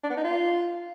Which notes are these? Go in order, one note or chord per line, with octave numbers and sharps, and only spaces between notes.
D4
B3
D#4
F4